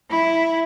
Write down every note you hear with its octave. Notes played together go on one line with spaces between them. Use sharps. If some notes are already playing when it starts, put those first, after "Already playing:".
E4